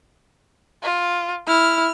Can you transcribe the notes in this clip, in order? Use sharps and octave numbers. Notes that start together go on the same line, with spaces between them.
F4
E4 F6